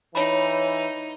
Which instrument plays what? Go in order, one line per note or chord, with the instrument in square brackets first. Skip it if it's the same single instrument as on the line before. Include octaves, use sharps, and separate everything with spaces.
[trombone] E3 [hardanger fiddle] D#4 [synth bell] C#5 B5